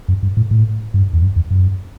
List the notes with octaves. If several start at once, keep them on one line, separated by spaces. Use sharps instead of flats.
F#2
G2
A2
A2
G2
E2
F#2
E2
F#2